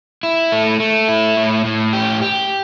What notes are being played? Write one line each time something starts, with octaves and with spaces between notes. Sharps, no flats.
E4
A3
A3
E4
A2
A2
G4
G4